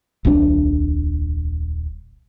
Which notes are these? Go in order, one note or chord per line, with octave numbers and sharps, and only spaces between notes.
D#1 C2 C#4 D4